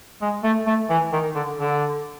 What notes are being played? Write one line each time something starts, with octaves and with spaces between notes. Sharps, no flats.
G#3
A3
A3
E3
D#3
D3
D3